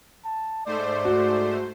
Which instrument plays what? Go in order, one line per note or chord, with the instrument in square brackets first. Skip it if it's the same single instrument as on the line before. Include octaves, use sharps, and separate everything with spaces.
[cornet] A5
[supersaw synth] G#2 A3 C5 [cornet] D5
[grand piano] F#4